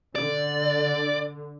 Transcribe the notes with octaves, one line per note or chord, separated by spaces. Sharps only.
D3 D5